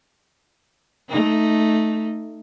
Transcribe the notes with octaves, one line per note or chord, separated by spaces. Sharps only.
A3 D#4